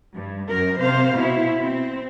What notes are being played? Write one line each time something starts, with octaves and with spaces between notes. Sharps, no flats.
G2
F#2 A#4
C3 C5 F5
B2 E4
C4